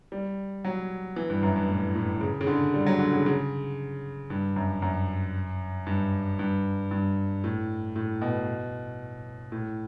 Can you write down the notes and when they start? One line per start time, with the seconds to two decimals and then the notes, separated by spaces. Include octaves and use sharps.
0.12 G3
0.65 F#3
1.16 E3
1.30 G2
1.43 F#2
1.56 G2
1.69 A2
1.95 A2
2.21 C#3
2.41 C#3
2.47 D3
2.74 G3
2.86 F#3
2.99 D3
3.13 C#3
3.26 C#3
4.30 G2
4.56 F#2
4.82 F#2
5.87 G2
6.39 G2
6.91 G2
7.44 A2
7.96 A2
8.22 B2
9.52 A2